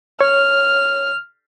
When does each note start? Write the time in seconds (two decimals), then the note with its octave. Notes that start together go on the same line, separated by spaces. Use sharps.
0.21 C#5 F6